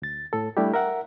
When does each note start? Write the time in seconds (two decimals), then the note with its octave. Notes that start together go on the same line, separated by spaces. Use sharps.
0.02 D2 A6
0.33 A2 A4
0.57 G3 A3 D4 E4 G4
0.74 A#4 E5 F#5